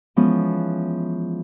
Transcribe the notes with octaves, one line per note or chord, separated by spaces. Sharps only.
E3 F3 G#3 B3 C#4